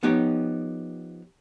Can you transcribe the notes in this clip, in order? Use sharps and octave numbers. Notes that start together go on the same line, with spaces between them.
F3 B3 D#4 G4 C#5